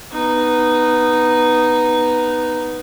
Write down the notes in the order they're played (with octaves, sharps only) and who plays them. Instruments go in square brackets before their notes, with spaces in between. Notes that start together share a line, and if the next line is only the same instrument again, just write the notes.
[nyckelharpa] B3 D#4